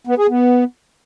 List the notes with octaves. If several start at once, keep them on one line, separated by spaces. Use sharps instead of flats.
B3
G#4
B3